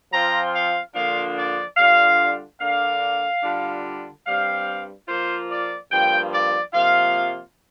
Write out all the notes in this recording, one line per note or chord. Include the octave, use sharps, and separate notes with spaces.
F3 C4 F4 A#5
F5
D3 F3 A#3 D4 F4 F5
D5
D3 G3 D4 F4 F5
D3 A#3 D4 F5
D3 G3 D4 F4
G2 G3 C4 F5
F3 A#3 F4 C5
D5
G2 F3 A#3 G5
D5
C3 F3 A#3 F4 F5